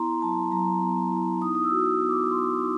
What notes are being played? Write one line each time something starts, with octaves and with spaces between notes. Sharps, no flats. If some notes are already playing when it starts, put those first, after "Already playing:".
Already playing: B3 E4 A#5 C6
F#3 A5
F#3 A#5
B3
E4
D#4 D#6
D#6
E6
F#4
D#6
B3
D6
B3 C6
D#4